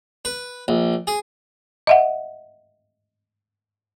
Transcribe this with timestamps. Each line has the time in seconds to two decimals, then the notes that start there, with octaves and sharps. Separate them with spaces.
0.25 B4
0.68 A#1
1.07 G#4
1.87 D#5 E5 F#5